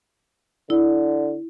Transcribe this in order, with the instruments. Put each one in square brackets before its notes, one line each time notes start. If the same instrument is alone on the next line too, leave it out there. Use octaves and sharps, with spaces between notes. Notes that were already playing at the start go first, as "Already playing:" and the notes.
[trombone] D3 [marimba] E4